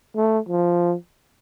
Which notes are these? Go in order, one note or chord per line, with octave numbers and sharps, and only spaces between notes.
A3
F3